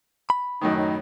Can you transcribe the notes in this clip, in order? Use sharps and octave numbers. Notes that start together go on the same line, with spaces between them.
B5
F#2 A2 D#3 D#4
D#4